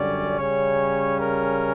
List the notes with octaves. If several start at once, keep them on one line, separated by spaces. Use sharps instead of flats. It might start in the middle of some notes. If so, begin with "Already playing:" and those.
Already playing: F#2 D3 G3 C#4 D5
C#3 G3 C#4 C#5
A#4